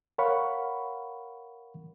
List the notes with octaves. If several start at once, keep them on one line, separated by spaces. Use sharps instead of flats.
A#4 C#5 F5 F#5 B5 C#6